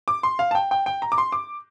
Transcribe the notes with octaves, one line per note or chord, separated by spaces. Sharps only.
D6
C6
F5
A5
G5
G5
G5
A#5
D6
C6
D6